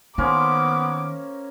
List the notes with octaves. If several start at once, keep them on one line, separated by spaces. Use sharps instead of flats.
D#3 A#3 B3 C#4 C5 D6